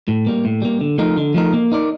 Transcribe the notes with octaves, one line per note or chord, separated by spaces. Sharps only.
A2
G3 A#3
A2
G3 A#3
D3
F3 A3 D#4 A#4
D3
F3 A3 D#4 A#4
A#3
D#4 A#4 D5